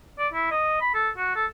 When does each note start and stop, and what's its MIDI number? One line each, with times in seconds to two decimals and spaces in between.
0.18 0.27 74
0.33 0.47 64
0.51 0.78 75
0.81 0.89 83
0.94 1.09 69
1.17 1.35 66
1.35 1.46 69